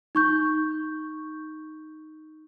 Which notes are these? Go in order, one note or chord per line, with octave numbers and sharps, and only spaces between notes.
D#4 C#6 G6